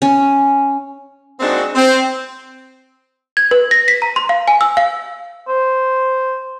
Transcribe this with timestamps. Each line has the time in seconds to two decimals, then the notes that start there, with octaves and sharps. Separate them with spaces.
0.02 C#4
1.40 G#3 A#3 C4 D4 D#4 F#4
1.75 C4
3.37 G#6
3.51 B4
3.71 A#6
3.88 B6
4.02 A#5
4.16 C6
4.29 F5
4.48 G#5
4.61 E6
4.77 F5
5.48 C5